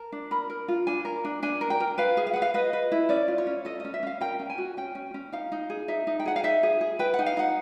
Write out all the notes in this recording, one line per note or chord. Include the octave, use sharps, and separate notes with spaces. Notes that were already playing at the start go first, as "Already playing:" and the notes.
Already playing: A#4 A5
D4
A#4 B5
A#4
F4
D4 G#5
A#4
D4
D4 G#5
A#4
G5
A#4
B4 F5
G#4
F5
B4 F#5
F5
B4 D#5
B4
E4
C#4 D5
F4
C#5
C#4
A4 D#5
C#4 D#5
E5
C#4 F5
A#4 G5
C#4
G#5
F#4
C#4 G5
C#4
C#4
D#4 F5
D#4
G#4
D#4 E5
D#4
G5
G#4 F#5
F5
D#4 E5
G#4
G#4
B4 G5
F#5
D#4
F5
D#4 F#5